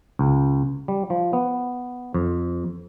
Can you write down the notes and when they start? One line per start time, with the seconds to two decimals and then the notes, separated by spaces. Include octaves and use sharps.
0.19 C#2
0.88 G3
1.10 F3
1.33 B3
2.14 F2